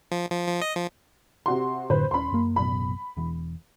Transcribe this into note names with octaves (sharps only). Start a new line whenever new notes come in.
F3
F3
F3
D#5
F3
C3 F#4 C6
F#2 A2 D3 B4 C5
D#1 C#4 B5 C6
F#2 A#3
A1 F#2 B2 B5
E1 E2